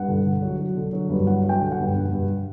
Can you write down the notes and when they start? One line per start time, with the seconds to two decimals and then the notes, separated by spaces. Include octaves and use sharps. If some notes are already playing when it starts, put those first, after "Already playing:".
Already playing: G2 F#5
0.08 D3
0.25 D3
0.42 F#3
0.58 F#3
0.76 D3
0.93 F#3
1.10 G2
1.27 F#3 F#5
1.43 F#3
1.49 G5
1.61 D3
1.72 F#5
1.78 G2
1.95 G2
2.11 G2